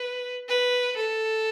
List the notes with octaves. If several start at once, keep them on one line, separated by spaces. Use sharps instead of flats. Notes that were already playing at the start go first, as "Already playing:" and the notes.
Already playing: B4
B4
A4